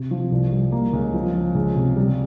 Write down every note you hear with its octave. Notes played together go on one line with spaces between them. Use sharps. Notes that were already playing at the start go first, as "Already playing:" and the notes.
Already playing: C3
F3
C2
G3
A#3
C#2
F3
F3
C#2
C3
G3